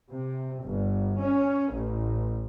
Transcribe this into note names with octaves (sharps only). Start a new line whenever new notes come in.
C3
G1
C#4
A1